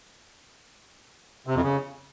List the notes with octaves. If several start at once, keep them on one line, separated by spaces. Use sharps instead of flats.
C3
F2
C#3